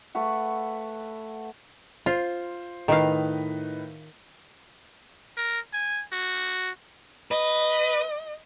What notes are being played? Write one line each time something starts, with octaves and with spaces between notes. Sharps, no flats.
A3 B4 F#5
F4 C5
A2 D#3 D#4 B4 F5
A#4
G#5
F#4
B4 D#5